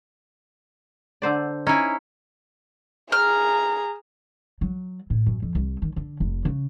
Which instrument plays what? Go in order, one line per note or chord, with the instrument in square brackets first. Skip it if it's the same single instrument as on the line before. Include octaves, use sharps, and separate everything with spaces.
[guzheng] D3 C5 D5
[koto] C#4 E4 [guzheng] D#4 G#5
[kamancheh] G#4 A#5 [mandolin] F6
[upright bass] F#3
A2
F#2
F2
C2
D#3
D3
F1
C#3